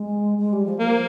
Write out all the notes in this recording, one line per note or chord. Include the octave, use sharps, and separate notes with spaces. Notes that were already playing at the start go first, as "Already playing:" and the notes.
Already playing: G#3
G#3
G3
F3
F3 A#3